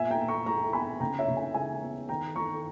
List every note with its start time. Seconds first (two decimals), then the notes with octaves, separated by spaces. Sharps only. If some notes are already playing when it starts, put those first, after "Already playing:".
Already playing: A#2 B3 E5 G#5
0.11 G5 A#5
0.20 A#2
0.28 A#5 C#6
0.46 G#3 A#5 C#6
0.73 B3 G#5 B5
1.00 C#3 G5 A#5
1.19 C#5 E5
1.28 C#3
1.37 E5 G#5
1.54 G#3 E5 G#5
1.82 B3
2.09 D#3 G5 A#5
2.36 D#3 A#5 C#6